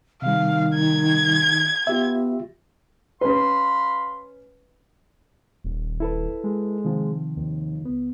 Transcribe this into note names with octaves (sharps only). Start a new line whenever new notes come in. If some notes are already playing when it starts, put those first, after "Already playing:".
C3 D#3 G3 F5
G#6
B3 F4 G4 E5
C#4 B4 F5 B5 C6
D#1
E4 A4 B4
G#3
C3 D#3 F3
D#2
C#2 B3